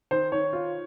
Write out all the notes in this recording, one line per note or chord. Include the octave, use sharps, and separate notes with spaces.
D#3 C5
D#3 C#5
F4